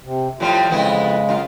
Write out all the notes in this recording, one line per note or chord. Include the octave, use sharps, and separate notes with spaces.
C3
A2 F3 G3 F4
F2 C#3 G#3 B3 E4
F#2 F4